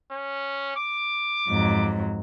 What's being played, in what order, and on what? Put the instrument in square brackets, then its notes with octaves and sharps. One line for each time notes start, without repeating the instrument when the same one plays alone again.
[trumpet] C#4
D6
[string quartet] F2 G#2 F#3